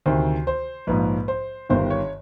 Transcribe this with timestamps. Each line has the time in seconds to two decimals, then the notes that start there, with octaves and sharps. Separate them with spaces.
0.06 D2 C3 D#3 C5
0.47 C5
0.87 A#1 G#2 F3 B4
1.28 C5
1.69 G1 G2 D#3 C5
1.90 C#5